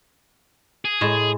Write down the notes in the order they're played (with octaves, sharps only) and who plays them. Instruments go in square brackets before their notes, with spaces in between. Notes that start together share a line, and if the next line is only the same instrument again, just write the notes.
[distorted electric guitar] G#4
[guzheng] A2 G#3 A5